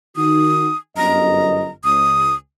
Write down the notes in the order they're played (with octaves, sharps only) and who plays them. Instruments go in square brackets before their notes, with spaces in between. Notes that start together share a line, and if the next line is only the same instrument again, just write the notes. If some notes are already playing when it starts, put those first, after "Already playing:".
[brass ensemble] D#3 D#4 F#4 [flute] D#6
[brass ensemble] G1 F#2 D#5 [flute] A#5
[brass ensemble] C#2 [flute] D#6